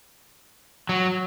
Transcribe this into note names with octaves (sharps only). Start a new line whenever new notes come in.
F#3